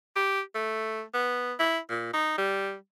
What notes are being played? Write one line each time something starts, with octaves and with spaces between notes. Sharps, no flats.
G4
A3
B3
E4
A#2
D#4
G3